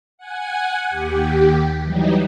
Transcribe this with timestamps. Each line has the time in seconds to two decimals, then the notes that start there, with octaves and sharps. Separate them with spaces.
0.18 F#5 G#5
0.89 D#2 G4
1.83 E3 F#3 G3 D#4